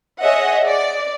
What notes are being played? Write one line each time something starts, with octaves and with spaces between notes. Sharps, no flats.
G#4 C#5 D#5 E5 F#5
D5